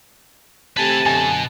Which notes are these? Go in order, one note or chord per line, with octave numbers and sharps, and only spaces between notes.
C3 A3 G4 B4 G#5 A5
F#2 B2 D3 G#5